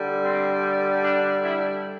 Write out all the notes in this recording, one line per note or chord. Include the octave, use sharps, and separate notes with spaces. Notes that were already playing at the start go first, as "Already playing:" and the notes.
Already playing: D3 G3
C4
D4
E4